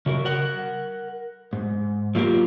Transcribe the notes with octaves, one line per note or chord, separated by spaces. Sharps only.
C#3 F#4 A#4
A#4 F#5
G#2
F#3 A#3 F4 G4 G#4 A#4